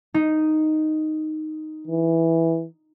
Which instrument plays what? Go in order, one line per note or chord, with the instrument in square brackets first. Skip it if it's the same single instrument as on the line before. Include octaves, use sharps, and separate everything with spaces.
[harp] D#4
[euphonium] E3